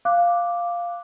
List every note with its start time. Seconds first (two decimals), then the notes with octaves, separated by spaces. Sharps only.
0.05 F5 D6 F#6